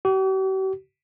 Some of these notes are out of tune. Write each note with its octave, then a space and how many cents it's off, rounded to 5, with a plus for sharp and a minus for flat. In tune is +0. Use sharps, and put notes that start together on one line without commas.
G4 -45